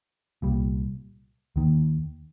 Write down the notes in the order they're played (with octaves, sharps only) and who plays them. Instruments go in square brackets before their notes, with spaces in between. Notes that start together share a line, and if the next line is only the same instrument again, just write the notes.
[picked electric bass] C2 A#2 G3
D#2 D#3 A#3